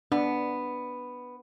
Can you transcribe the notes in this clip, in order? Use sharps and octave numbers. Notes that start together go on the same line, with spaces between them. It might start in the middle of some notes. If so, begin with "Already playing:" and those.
B3 D4